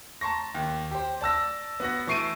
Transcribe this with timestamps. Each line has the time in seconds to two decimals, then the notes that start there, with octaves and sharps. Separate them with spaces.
0.21 A5 A#5 C6 C#6 A#6
0.55 D#2
0.91 G4 C5
1.21 D5 A5 E6 A#6
1.80 B3 F#4 A#6
2.07 E3 A3 C#6 C7 D7 D#7